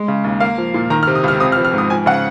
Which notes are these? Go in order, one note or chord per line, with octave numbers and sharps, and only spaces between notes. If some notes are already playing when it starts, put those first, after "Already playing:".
Already playing: G#3
C#3
D#2
A#3 F5
F3
A#2
D#3 A#5
F6
C3
D#6
C#2 F6
C4 D#6
F6
F3
F6
G#2 D#6
F3 G#5
C#3 F#5